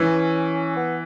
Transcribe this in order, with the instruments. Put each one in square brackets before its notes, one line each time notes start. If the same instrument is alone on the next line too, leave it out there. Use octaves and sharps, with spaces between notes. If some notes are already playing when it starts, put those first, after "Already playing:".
Already playing: [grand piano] E3 [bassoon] C#4
[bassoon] B3